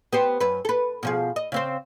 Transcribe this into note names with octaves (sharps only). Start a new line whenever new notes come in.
B3 G4 C5
F#2 B4
A4 B4
B2 F3 G#4
D#5
C#3 C4 C5